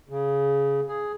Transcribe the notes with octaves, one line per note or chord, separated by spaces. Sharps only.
C#3
G#4